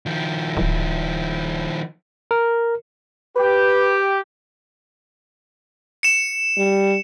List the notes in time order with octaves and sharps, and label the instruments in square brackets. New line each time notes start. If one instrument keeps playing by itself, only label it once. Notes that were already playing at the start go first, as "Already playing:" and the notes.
[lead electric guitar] D#3 F3
[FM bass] D1
[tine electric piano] A#4
[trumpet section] G4 [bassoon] B4
[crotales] C#7 E7
[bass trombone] G3